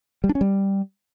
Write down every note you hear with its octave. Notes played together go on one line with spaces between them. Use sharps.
G3
D4
C#4
G3